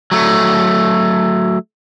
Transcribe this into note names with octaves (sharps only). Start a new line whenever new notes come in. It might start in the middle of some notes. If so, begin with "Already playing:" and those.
F#3 A3